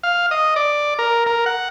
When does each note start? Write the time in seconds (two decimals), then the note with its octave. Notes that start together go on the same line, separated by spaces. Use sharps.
0.03 F5
0.31 D#5
0.56 D5
0.99 A#4
1.26 A#4
1.46 F#5